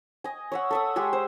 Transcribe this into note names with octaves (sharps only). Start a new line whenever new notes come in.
D#5 G#5
C#5 E5 F#5
A4 E5 D#6
G#3 G4 G#4 E5
C5